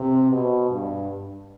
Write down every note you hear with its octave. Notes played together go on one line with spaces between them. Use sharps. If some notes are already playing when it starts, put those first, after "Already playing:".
Already playing: C3
B2
G2